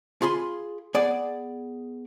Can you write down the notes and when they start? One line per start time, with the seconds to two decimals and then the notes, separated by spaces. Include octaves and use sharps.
0.22 F4 G#4 B5 C6
0.94 B3 G#4 D5